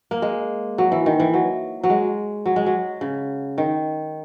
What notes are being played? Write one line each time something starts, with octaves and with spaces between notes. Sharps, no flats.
A#3
G#3
F#3
E3
D#3
E3
F#3
F#3
G#3
F#3
G#3
F#3
C#3
D#3